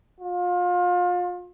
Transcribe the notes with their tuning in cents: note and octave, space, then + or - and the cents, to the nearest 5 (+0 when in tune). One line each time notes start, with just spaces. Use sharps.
F4 +30